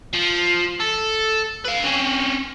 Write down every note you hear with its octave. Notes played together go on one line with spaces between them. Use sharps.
F3
A4
B4 F5
C4 C#4